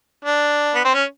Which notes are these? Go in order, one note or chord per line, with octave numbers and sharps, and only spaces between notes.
D4
B3
C4
C#4